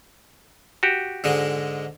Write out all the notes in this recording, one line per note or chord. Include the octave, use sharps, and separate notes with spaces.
F#4 G4
G#2 D3 G#3